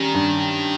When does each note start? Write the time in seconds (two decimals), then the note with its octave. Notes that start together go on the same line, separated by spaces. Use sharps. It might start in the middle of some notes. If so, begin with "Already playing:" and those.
Already playing: D#3 G3 C#4
0.14 G2